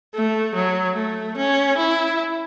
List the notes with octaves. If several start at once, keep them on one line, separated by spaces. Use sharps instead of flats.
A3
F#3
A3
C#4
E4